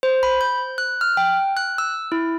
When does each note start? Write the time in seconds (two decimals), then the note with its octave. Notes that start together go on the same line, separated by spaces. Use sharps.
0.03 C5
0.23 B5
0.41 G6
0.78 F#6
1.01 F6
1.17 G5
1.57 F#6
1.78 E6
2.12 E4